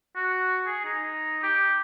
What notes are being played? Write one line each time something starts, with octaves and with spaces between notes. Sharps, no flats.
F#4
G#4
D#4
G4